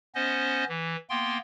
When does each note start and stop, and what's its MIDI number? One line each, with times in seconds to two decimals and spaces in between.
0.15 0.64 59
0.15 0.64 61
0.15 0.64 72
0.15 0.64 75
0.69 0.96 52
1.10 1.38 58
1.10 1.38 59
1.10 1.38 79
1.10 1.38 84